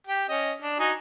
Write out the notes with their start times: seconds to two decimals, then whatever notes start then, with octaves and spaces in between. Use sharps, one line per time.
0.07 G4 G5
0.29 C#4 D#5
0.62 D4
0.80 D#4 F#4 G#5